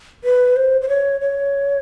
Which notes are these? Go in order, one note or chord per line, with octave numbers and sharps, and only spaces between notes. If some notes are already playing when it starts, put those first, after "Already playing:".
B4
C5
C5
C#5
C#5